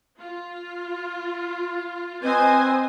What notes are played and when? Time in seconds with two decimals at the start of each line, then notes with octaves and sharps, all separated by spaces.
0.19 F4
2.23 C4 B4 C5 D#5 G#5